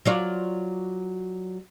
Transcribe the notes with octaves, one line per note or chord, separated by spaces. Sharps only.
F#3 F4 D5